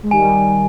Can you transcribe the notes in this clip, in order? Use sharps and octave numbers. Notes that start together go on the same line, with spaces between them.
G#3
D#3 G3 G#5